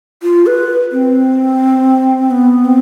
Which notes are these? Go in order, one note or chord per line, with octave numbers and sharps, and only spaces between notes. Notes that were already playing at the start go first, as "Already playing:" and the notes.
F4
B4
C4
B3
C4